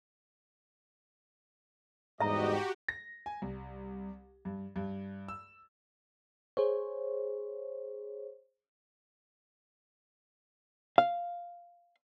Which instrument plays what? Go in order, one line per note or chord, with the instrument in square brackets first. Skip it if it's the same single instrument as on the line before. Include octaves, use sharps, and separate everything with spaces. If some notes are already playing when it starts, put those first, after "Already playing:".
[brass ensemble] E2 G3 D#5 [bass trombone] G#2 [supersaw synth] F#4 G4 [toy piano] E5 A#5
[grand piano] A#6
G#5
C2
G2
G2
E6
[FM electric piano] G#4 C5 C#5
[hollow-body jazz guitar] F5